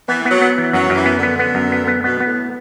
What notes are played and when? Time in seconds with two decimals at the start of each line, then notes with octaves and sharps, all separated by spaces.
0.08 E3 B3
0.25 F#3 B3
0.41 B3
0.58 E3
0.73 F#2 F#3
0.90 F#2
0.95 E3
1.06 B3
1.17 D3
1.23 B3
1.39 B3
1.55 F#2
1.72 B3
1.88 B3
2.04 B2 B3
2.20 B3
2.26 A2